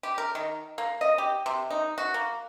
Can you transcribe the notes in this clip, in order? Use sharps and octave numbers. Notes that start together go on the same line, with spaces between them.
G4
A#4
D#3
A#3
D#5
G4
C3
D#4
F#4
A#3